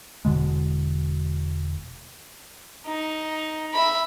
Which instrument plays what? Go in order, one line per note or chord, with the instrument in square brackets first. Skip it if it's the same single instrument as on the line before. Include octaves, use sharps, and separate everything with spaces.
[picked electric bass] E1 B2 D3 G#3
[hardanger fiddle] D#4
E5 B5